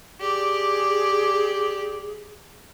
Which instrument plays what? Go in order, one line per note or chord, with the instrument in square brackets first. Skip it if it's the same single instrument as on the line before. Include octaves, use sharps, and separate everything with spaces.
[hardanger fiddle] G4 D5 [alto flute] G#4